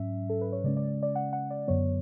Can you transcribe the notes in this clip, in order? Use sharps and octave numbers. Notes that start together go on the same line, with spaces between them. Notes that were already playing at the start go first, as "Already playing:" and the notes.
Already playing: G#2 F#3 C#4 E5
A4
B4
C#5
C#3 G#3 C#4 D5
D5
D5
F#5
F#5
D5
F#2 D3 F#3 B3 C#5